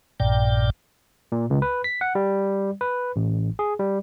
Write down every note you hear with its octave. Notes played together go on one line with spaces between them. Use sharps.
A#1 G2 A#2 D5 G5
A#2
C#2
B4
B6
F#5
G3
B4
A1
G#4
G3